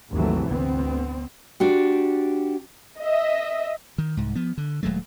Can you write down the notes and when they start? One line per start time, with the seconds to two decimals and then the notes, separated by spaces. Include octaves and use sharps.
0.12 G#1 D#2 C3 E3 F#3 A3
0.49 D2 B3 C4
1.60 D4 F#4 G4
3.00 D#5 E5
3.98 D#3
4.17 C2 G#2
4.35 F3 B3
4.58 D3
4.83 D#1 F#3 G#3 A3